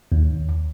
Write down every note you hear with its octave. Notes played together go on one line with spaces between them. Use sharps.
D#2